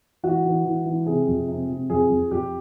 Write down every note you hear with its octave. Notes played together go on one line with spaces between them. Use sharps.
E3 F#4
E3
E3
E3
C3 G#4
F2
C3
C3
F2 G#4
F2
F2 G4